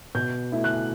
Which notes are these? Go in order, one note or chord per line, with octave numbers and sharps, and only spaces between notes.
B2 G6
A3 E4
F#6